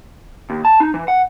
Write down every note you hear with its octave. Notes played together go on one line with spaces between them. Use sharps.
D#2
A5
D#4
E3
F#5